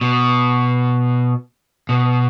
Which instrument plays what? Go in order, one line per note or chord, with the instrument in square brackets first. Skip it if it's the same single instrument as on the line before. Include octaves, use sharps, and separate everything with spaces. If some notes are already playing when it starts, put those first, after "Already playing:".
[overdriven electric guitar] B2
B2